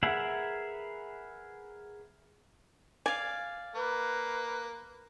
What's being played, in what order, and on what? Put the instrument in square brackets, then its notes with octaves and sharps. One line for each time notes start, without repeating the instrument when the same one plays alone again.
[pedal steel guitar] G#4 A#4 B4 E5 F#5
[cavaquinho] D5 F5 [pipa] G#5
[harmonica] A#3 [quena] B4